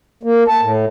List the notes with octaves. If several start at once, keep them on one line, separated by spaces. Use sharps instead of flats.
A#3
A5
A2